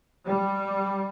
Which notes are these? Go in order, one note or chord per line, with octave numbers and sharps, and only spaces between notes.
G3